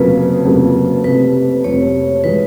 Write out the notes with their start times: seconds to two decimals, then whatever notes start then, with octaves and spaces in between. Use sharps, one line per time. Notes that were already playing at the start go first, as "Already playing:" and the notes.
Already playing: F1 F2 C#3 F#3 A#3 B4
0.45 F1 F2 C#3 F#3 A#3
1.04 F1 F2 C3 B4
1.64 F1 F2 C3 C#5
2.24 E3 G#3 B4